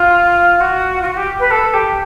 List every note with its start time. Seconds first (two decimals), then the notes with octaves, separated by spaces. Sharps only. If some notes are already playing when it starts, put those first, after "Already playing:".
Already playing: F4
0.60 F#4
1.02 F4
1.05 F#4
1.16 G4
1.39 B4
1.51 A4
1.73 G4